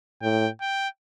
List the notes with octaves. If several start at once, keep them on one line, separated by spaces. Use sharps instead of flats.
A2 G5
G5